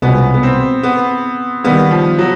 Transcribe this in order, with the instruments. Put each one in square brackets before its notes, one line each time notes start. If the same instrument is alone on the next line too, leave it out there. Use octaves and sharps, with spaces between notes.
[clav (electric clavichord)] C2 B2 G#3 C#4 F4 [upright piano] B3
[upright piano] B3
C4
B3
[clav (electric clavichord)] D#3 G3 A#3 [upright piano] B3
[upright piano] F3
F#3